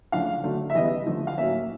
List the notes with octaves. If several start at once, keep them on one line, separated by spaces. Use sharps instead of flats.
C#3 F3 A3 D4 F5
D3 F#3 A3 D4
E5
C#3 E3 G3 B3 D#5
D3 F3 A3
F5
A2 F#3 A#3 C#4 E5